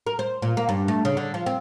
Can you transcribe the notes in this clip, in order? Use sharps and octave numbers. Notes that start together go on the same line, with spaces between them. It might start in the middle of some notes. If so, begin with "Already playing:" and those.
A#4
C5
A#2
A#3
G2
A3
C#3
D3
F3
C4